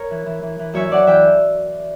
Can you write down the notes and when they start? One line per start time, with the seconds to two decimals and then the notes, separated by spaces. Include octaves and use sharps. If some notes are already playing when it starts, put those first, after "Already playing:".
Already playing: A#4 C#5
0.11 E3
0.26 E3
0.42 E3
0.59 E3
0.74 F#2 C#5 E5
0.89 F#2 D5 F#5
1.07 E3 E5 G5